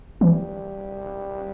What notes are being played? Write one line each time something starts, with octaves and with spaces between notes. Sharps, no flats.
E3 G3